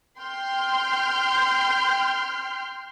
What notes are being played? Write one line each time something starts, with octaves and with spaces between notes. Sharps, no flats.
G5 C6 F6 G6